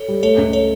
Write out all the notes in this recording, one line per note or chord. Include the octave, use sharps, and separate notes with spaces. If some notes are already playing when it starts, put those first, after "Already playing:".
Already playing: A4 C#5
G3
A3 A4 C#5
C#2
A4 C#5